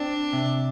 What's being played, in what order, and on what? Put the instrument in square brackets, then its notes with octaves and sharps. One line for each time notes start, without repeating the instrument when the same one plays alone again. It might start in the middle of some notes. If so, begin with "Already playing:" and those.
Already playing: [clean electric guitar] C4 [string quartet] D4
[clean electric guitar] C3